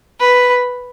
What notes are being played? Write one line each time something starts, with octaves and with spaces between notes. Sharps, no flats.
B4